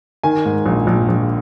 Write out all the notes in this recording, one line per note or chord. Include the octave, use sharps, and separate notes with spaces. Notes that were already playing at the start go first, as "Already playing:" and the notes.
D#3 G#5
G#2
A#1
A#1
A#1